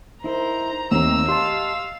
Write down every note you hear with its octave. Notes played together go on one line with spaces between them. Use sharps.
D#4 E4 A#4 C5 A#5
D#2 D#3 A3 C4 E6
G4 D#5 F5 A5 C6